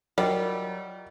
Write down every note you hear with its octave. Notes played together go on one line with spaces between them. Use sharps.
F#3 G3 F4 A#4 D#5 F#5